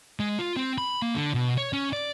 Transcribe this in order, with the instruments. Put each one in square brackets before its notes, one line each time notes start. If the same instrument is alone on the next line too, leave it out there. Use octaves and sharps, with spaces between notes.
[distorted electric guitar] G#3
F4
C4
B5
A#3
D3
B2
C#5
C#4
D5